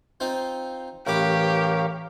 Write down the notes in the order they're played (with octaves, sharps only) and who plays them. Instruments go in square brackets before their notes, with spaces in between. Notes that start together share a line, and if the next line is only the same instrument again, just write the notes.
[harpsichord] C4 D#4 F4
[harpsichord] A1 B4 D6 [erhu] G4 [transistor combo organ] A#4 C#5 F5